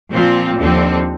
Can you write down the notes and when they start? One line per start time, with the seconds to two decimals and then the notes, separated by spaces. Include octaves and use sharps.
0.11 A#2 F3 C4 F4
0.57 D#2 D3 F3 C4